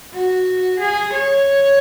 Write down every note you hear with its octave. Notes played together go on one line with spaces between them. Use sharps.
F#4
G#4
C#5